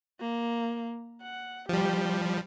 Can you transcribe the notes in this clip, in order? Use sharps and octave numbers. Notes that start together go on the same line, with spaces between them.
A#3
F#5
F3 G3 G4